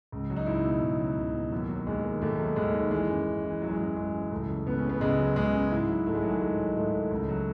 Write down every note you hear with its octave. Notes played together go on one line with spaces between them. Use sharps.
C#2
F#3
D#4
C#2 E4
B2
C#2
F#3
C#2
B2
D#2 F#3
F#3
D#2 G#3
D#3
D#2 A3
F#3
D#2 G#3
D#3
E3 G#3
F#2
F#2
E3
E3 F#3
G#3
F#2 F#3
F#2 G#3
E3
C#2 A3
F#3
C#2 B3
C#4
C#3
B3
C#2 G#3
F#3
C#2 G#3
C#3
G#2 E4
F#3
G#2 A3
G#3
D#3 F#3
G#3
G#2 G#3
F#3
G#2 A3
D#3
C#2
F#3